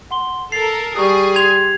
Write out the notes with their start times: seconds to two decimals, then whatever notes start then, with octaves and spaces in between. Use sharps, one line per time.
0.11 F#5 C6 G7
0.52 A4 A#4 A6 C7 F7
0.96 G3 G#4 C#6 D#6
1.36 C6 G#6 F7